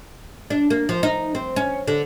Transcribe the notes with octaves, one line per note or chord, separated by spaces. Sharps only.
D4
A#3
F3
D#4
C4
C#4
D3